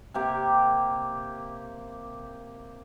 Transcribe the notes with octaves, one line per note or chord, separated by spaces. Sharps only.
C3 A#3 G4